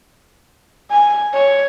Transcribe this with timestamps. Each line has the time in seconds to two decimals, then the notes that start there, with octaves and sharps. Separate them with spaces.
0.91 G#5
1.33 C#5